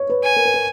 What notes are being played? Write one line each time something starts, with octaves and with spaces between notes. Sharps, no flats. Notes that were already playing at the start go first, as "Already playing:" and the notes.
Already playing: C#5
B4
G#5
A#4
B4
A#4